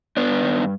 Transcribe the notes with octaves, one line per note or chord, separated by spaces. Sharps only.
G2 B3 D4
D#3